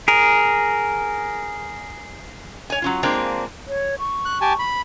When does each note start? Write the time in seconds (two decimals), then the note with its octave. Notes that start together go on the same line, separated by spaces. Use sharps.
0.08 G#4 A#4
2.70 C#5 G#5
2.82 F#3 C#4 F4
3.03 G#3 A#3 C4 D4 F4
3.68 C#5
3.99 C#6
4.25 F#6
4.41 G4 G#5 A5
4.59 B5